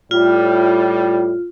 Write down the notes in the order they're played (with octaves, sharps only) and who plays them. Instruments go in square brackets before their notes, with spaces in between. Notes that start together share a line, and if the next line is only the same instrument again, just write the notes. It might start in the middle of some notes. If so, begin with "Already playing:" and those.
[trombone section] A2 G3 [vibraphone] F4